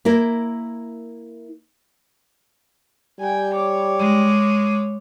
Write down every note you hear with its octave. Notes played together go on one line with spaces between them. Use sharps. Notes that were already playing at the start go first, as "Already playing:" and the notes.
A#3 E4 A#4
G3 G5 G#5
C#5 D6
G#3